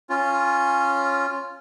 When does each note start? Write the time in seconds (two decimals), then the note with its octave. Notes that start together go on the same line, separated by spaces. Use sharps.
0.10 C#4 F4